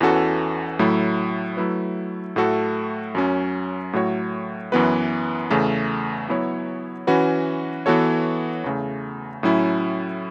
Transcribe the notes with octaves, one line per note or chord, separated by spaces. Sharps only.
E2 E3 C#4 F#4 A4
A2 F#3 A3 E4
F#3 A3 E4 B4
A2 A3 F#4 A4
F#2 F#3 C#4
A2 F#3 A3 F#4 C#5
F#2 E3 B3 F#4 B4
E2 C#3 A3
F#3 B3 E4 C#5
E3 C#4 F#4 B4
E3 B3 F#4 A4 C#5
E2 C#3 A3
A2 F#3 C#4 E4